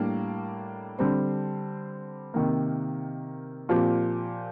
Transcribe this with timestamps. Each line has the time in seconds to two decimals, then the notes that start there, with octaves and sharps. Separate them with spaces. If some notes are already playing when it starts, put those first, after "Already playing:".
Already playing: A2 G3 A#3 D4
0.99 D3 G3 C4
2.34 C3 D#3 A#3
3.69 A#2 F3 C4 G4